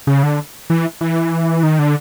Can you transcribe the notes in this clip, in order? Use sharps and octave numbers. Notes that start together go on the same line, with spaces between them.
C#3
D3
E3
E3
D#3
D3